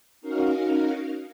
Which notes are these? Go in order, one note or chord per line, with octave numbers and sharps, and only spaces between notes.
C#4 D#4 F#4 A#4 F5